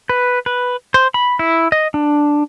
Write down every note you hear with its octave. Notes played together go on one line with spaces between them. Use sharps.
B4
B4
C5
B5
E4
D#5
D4